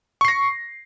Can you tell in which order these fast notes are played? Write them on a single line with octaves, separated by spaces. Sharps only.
C#6 C7 A#6